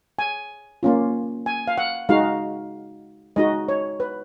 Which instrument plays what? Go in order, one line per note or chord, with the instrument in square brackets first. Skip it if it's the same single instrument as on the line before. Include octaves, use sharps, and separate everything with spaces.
[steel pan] G#5
A#3 C#4 F4
G#5
F5
F#5
G#3 D#4 F#4 F5
G#3 D#4 F#4 D#5
C#5
B4